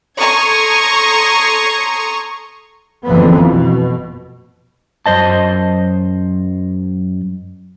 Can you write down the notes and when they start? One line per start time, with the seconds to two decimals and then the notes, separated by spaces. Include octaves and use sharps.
0.18 A4 A#5 C6 C#6 D#6 G#6
3.05 F#1 F2 D3 E3 B3
3.43 B2
5.06 F#2 C5 D#5 A5